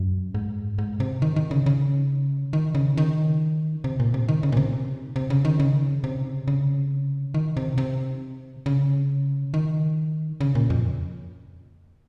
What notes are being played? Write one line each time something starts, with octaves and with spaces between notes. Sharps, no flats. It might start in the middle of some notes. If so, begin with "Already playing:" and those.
Already playing: F#2
G#2
G#2
C3
D#3
D#3
C#3
C#3
D#3
C#3
D#3
C3
A#2
C3
D#3
C#3
A#2
C3
C3
C#3
D#3
C#3
C3
C#3
D#3
C3
C3
C#3
D#3
C#3
A#2
F2